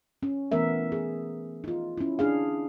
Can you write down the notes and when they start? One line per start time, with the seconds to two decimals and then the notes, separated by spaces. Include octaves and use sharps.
0.23 C#4
0.52 E3 A3 B3 A#4 E5
0.92 G#4
1.64 D#4 F4
1.98 C#4 E4
2.19 D4 G#4 F5